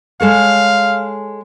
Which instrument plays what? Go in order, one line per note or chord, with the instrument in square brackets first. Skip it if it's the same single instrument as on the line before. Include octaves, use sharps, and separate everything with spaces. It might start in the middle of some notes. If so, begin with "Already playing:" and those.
[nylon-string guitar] G#3 A4 C#5 [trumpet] F5